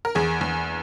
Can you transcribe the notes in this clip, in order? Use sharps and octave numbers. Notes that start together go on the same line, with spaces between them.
A#4
E2 G#4
E2